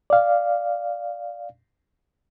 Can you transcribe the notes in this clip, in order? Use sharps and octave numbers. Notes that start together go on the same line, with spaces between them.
D5 F5